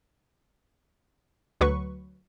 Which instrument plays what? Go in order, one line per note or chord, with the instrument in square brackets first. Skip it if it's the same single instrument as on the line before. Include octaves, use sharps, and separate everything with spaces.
[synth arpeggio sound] D2 F#3 B4 C#6